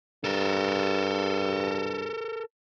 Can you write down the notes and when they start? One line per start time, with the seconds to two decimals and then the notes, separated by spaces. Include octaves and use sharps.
0.24 G2 A4 A#4